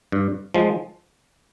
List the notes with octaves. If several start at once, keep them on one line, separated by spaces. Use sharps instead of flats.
G2
F3 G#3